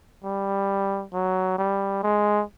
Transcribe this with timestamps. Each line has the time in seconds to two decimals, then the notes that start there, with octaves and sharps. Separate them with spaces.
0.24 G3
1.13 F#3
1.58 G3
2.03 G#3